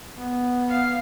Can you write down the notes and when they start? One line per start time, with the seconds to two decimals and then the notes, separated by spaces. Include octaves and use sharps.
0.14 B3
0.68 F5